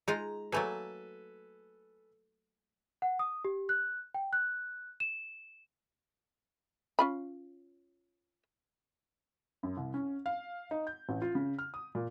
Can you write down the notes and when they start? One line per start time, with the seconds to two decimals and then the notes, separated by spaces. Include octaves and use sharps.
0.08 G#3 D#4 F4 A#5
0.52 F#3 A3 A#3 A4 B4 G#5
3.02 F#5
3.19 D#6
3.45 G4
3.69 F#6
4.14 G5
4.33 F#6
5.00 E7
6.99 C#4 F4 B5
9.63 F#2
9.77 C2
9.94 C#4
10.26 F5
10.71 D#4
10.87 G6
11.09 A1
11.22 F4
11.35 C#3
11.59 F6
11.74 D#6
11.95 A#2